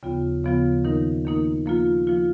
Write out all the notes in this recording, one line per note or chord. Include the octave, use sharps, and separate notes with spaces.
D#2 C#3 F3 B3 F4
D#2 C#3 F3 B3 F4
D#3 A#3 D#4 A#4
D#3 A#3 D#4 A#4
F3 A#3 F4
F3 A#3 F4